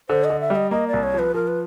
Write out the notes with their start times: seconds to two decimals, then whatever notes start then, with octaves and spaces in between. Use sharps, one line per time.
0.09 D3 C5
0.24 D#5
0.30 D3
0.40 E5
0.50 G3
0.56 D#5
0.71 A#3 D#5
0.88 D5
0.93 C2
1.03 C#5
1.14 F3 B4
1.34 F3 A#4
1.48 B4